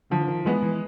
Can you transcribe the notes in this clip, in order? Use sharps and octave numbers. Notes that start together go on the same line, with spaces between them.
D3 F3
E3
D#3
E3 G#3 B3
E3